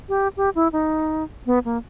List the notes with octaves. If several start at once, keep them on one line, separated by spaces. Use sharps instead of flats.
G4
G4
E4
D#4
B3
A#3